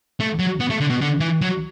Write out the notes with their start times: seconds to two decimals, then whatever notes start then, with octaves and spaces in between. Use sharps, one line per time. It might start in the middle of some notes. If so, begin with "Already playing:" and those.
0.20 A3
0.39 F#3
0.60 B3
0.70 A3
0.81 D3
0.90 B2
1.01 D3
1.20 E3
1.42 F#3